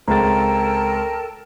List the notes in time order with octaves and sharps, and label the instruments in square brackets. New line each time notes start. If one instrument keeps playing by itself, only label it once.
[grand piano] C#2 C4 A6 [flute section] A4 G5 A5 [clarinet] A#4 [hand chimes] A#5